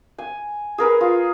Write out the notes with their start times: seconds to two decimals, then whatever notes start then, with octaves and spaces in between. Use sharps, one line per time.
0.18 G#5
0.78 G#4 A#4 B4
1.01 F4